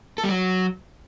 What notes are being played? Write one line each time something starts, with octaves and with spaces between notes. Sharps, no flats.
A4
G3
F#3